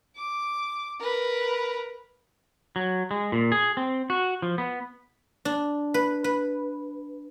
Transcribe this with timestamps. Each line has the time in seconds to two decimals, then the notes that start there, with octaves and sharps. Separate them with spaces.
0.16 D6
1.00 A#4 B4
2.76 F#3
3.11 G#3
3.32 A#2
3.52 G#4
3.77 C4
4.10 F#4
4.42 F3
4.58 B3
5.45 D4
5.94 B4
6.24 B4